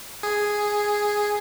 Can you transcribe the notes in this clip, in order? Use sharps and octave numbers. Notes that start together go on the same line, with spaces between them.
G#4